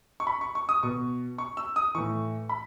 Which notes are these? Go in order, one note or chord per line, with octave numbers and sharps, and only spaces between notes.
C#6
B5
C#6
C#6
D#6
B2 C#6
C#6
E6
D#6
A2 E3 C#6
B5